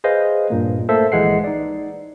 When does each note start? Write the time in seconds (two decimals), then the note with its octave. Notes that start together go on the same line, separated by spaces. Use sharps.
0.04 G#4 B4 C5 D#5 F5
0.50 G2 A#2 A#3
0.88 A3 A#3 A4 C5 E5
1.12 A#1 E3 G#3 F#5 C7
1.44 D#4 D5